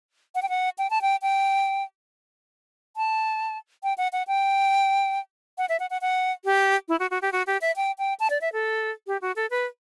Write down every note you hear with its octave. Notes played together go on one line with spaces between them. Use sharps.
F#5
G5
F#5
G5
A5
G5
G5
A5
G5
F#5
F#5
G5
F#5
E5
F#5
F#5
F#5
G4
E4
F#4
F#4
G4
F#4
G4
E5
G5
G5
A5
D5
E5
A4
G4
F#4
A4
B4